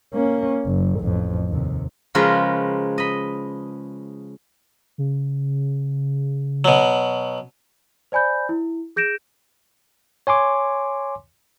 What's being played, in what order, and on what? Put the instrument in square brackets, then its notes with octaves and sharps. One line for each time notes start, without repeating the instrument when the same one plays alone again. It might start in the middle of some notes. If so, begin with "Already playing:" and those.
[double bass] A#3 C#4
F#1
A1 F2
D#2 C3
[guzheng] C#3 F3 G#3 F4 A#4 B4
D#5 B5
[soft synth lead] C#3
[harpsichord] B2 F#3
[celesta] C5 D5 G#5 B5 G6
E4
G#4 G6 A#6 D7 E7
[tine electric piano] C#5 G#5 C6 D6